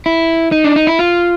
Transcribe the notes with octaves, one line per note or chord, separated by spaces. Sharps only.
E4
D#4
D4
D#4
E4
F4